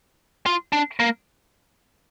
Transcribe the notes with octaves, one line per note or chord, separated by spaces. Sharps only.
F4
D4
A#3